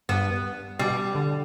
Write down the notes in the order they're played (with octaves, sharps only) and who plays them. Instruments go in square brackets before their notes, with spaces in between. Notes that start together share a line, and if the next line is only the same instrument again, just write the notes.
[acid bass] G2 [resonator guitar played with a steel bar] B3
[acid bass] B2 [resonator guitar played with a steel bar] G3
[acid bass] D3